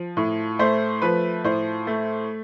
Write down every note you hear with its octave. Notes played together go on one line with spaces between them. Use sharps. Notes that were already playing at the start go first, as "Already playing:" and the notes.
Already playing: F3
A2
A3 C5
F3 B4
A2 C5
A3